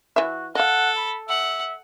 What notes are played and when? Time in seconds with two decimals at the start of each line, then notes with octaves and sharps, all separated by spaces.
0.16 E3 F#4 E5
0.55 A4 D#5 F5 F#5
0.97 B5
1.29 E5 F#5